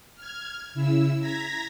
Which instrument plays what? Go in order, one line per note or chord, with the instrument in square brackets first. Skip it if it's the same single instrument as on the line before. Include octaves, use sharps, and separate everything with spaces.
[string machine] F6 G#6
C#3 E4 E6
A#5 G#6 A#6 B6